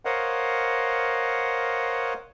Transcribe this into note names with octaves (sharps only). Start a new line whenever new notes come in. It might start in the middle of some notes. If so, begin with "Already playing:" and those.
A#4 C5 C#5 D#5 F5 F#5